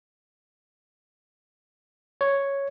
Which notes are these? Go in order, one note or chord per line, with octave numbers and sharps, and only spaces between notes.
C#5